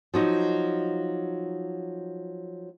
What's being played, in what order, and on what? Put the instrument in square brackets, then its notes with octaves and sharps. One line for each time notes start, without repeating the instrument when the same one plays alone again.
[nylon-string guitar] F3 F#3 D#4